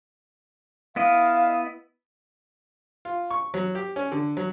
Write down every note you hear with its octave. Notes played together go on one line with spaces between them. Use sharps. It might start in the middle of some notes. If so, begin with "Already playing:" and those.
B3 E4 D#5 F5
F4
C#6
F#3
G4
C#4
D3
F#3